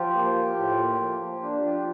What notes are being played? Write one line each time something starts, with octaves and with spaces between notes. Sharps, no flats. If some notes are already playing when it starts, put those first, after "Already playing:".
Already playing: F3 F4 G4
A#3
F3
A2
A#3
F3
A#3
D4
F3 F4 G4